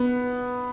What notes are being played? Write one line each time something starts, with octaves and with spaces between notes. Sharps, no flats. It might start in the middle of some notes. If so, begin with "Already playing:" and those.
Already playing: B3